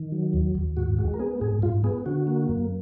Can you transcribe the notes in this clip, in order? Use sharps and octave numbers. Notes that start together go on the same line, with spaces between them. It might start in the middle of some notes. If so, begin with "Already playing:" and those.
Already playing: D#3
F#3
D#2
D#2
G#2 F#4
G#3 F#4
A#4
B3 G#4
G#2 G#4
G#2 F4
B3 G#4
D3 F#4
A#3
F#2